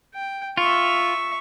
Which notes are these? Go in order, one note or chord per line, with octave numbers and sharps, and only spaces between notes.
G5
F4 E5 C#6